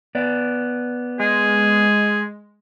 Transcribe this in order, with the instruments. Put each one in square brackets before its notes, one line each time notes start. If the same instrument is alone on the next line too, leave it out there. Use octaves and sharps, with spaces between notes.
[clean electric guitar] B3 D5
[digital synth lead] G#3 [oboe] G#4